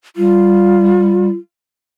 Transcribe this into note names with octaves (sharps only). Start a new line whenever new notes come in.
G3 F4